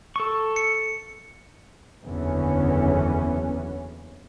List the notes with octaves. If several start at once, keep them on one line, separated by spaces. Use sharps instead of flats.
A4 C#6
C#7
F#1 E2 D3 E3 B3 C#4